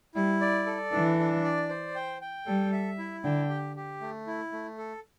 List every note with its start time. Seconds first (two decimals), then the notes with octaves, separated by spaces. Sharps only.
0.15 G3 E4
0.41 D5
0.66 A4
0.92 E3 D4
1.19 D4
1.44 D5
1.69 C5
1.95 G5
2.21 G5
2.46 G3 A4
2.72 E5
2.98 E4
3.24 D3 G5
3.49 G4
3.76 G4
4.01 A3
4.27 E4
4.52 A3
4.78 A4